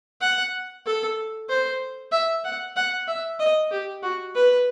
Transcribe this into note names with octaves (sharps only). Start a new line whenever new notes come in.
F#5
A4
C5
E5
F#5
F#5
E5
D#5
G4
F#4
B4